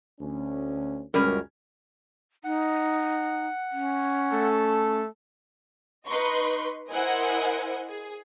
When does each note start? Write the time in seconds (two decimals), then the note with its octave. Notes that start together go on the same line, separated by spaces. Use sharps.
0.20 D2 C#4
1.14 C#2 F#2 G3 C#4 A#4
2.44 D#4 F#5
3.72 C#4
4.32 A3 A4
6.07 D#4 B4 D#5 C6 C#6
6.91 E4 A#4 C5 D#5 F#5 G#5
7.87 G#4